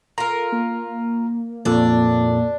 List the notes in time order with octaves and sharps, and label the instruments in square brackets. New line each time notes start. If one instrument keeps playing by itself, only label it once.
[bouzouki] F4 A#4 [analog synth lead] A4 [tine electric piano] A#5
[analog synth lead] A#3
[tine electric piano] F2 A#2 A4 [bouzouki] D4